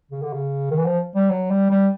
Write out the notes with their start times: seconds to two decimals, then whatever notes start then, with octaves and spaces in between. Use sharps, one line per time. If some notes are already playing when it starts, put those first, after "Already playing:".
0.11 C#3
0.22 D3
0.33 C#3
0.71 D#3
0.78 E3
0.86 F3
1.15 G3
1.30 F#3
1.51 G3
1.70 G3